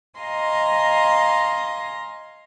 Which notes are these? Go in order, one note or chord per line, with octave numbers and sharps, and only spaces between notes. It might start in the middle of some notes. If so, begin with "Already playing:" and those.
D#5 F5 G#5 A#5 C6 A#6